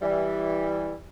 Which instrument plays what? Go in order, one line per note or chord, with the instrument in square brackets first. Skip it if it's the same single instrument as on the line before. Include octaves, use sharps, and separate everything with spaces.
[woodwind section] E3 G3